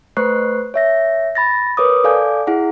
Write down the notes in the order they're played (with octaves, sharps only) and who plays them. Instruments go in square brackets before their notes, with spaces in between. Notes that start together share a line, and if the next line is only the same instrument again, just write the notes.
[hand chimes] A3 B4 C5 C#6 F#6 C7
C#5 E5 A#6
B5 A6 A#6
A#4 B4 C#5 D6 D#6
A4 D5 F5 G#5 D6 G6
E4 G#4 F#5